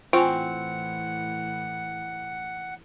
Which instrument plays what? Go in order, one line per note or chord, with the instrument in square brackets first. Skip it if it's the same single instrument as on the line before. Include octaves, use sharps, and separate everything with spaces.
[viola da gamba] A2 E3 [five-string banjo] C4 [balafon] F4 G#5 [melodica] F#5